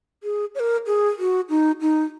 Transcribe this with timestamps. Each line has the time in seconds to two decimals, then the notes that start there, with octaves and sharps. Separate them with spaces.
0.23 G#4
0.55 C#5
0.59 A#4
0.86 G#4
1.19 F#4
1.49 D#4
1.81 D#4